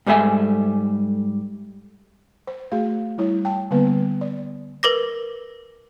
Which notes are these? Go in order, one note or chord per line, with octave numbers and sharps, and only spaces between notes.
G#2 G3 A3 G#4 E5 G#5
C5
A3 F#4 G#4 F5
G3 E4 C#5
G5 A5
D3 G3 A#3 B3 B4
D5
A#4 B4 D6 A#6